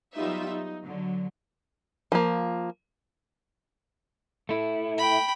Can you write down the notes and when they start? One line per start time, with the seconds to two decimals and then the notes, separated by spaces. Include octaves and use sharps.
0.16 F#3 G3 B3 D#4 F4 E5
0.49 D#4
0.84 D3 F#3
2.12 F3 A#3
4.49 A3 E4
4.98 G5 B5